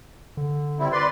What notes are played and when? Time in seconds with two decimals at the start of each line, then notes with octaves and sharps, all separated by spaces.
0.37 D3
0.79 G3 C4 E4
0.92 B4 D5 C6